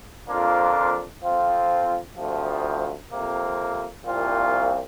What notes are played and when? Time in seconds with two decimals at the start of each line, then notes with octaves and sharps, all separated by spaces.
0.27 F2 F3 A#3 D4 F4
1.22 F2 F3 C4 F4
2.16 D2 C3 F3
3.10 F2 C3 A#3
4.05 C2 A#2 F3 C4 F4